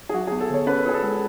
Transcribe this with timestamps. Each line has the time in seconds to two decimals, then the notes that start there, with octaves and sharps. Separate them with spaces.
0.09 G#4
0.13 F#3 F#4
0.27 G#4
0.32 B3
0.40 A4
0.50 D3 C#5
0.67 C#4 B4
0.86 F4 G#4
0.94 A4
1.03 G#3